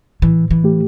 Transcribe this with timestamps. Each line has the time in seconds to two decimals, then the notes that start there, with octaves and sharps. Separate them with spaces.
0.22 A2 E3
0.51 E3
0.64 A3 G4